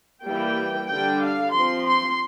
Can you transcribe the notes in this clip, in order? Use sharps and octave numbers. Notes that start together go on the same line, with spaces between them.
E3 G3 A#3 G5
D3 G3 D4 G5
F5
F3 C4 C6
C6